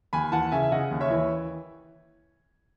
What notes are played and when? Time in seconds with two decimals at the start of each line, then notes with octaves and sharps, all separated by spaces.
0.13 D#2 G#5 B5
0.32 E3 F#5 A5
0.51 C#3 E5 G#5
0.63 E5
0.72 C#3 D#5 F#5
0.91 D#2
1.01 C#5 E5
1.10 E3